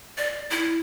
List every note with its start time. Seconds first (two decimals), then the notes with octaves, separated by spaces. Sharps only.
0.17 D5
0.50 E4